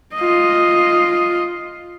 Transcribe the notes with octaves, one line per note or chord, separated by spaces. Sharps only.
F4 D#5